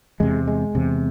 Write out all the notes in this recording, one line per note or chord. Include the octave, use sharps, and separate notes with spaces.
E2 C3 G#3
G#3
E2 C3